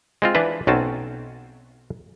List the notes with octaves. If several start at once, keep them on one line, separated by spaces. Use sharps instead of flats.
G#3 C4 F4
E3 D4 B4
B1 F#3 C4 C#4 A5